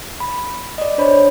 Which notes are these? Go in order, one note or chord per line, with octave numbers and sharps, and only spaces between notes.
B5
D5 D#5
D4 C5 C#5 B5